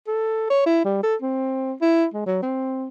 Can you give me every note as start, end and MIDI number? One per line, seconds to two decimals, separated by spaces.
0.07 0.48 69
0.50 0.63 73
0.66 0.83 64
0.85 1.02 55
1.03 1.15 69
1.22 1.73 60
1.81 2.06 64
2.14 2.26 56
2.26 2.42 54
2.42 2.88 60